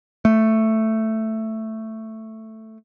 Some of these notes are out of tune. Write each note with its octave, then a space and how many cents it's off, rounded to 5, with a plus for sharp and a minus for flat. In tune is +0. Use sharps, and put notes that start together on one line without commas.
A3 +5